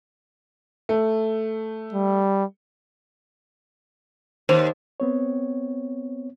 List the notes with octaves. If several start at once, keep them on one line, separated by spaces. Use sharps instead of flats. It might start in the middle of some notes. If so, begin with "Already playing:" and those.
A3
G3
D#2 C5
B3 C4 C#5